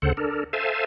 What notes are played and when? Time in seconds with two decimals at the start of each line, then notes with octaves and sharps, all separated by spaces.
0.02 D2 C#3 A4 C5 F#5
0.17 D4 A4 A#4
0.53 A4 C5 E5 F5 G#5 A5